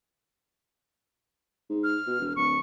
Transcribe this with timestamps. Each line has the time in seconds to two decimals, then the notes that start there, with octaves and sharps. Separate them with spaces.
1.70 G#2
1.84 F6
2.07 B2
2.20 E1
2.36 D1 C#6